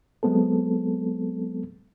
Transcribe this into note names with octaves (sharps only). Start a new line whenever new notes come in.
F#3 G#3 B3 C4 A4